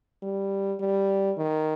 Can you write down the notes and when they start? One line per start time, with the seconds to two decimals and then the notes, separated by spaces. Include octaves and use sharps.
0.22 G3
0.80 G3
1.37 D#3